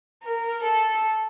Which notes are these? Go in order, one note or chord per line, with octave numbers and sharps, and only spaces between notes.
A#4
A4